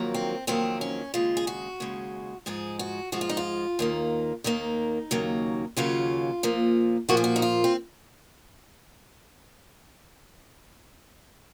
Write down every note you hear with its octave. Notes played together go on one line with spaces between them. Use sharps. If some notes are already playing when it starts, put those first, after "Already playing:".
Already playing: F2 D#3 F#3 A#3
C4
F2 D#3 F#3 A#3 C4
C#4
D#2 C#3 G#3 F4
G#4
F#4
D#2 C#3 G#3
G#2 F3 G#3 G#4
F#4
G#2 F3 G#3 F#4
F4
D#4
F4
D#2 D#3 A#3
D#2 D#3 A#3 D#4
D#2 C#3 F#3 A#3
D#2 C#3 F#3 A#3 F4
A#2 F3 A#3
A#2 F3 A#3 F#4
G#4
F#4
D#4
F4
C4